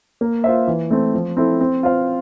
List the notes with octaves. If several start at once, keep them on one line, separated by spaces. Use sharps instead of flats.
A#3
F4 C5 E5
E3
A3 C4
F3
C4 E4 A4
C4
F4 C5 F5